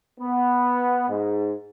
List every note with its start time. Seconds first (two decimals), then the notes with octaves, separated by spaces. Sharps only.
0.20 B3
1.08 G#2